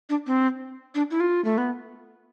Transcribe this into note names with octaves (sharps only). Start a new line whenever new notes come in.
D4
C4
D4
E4
F4
A3
B3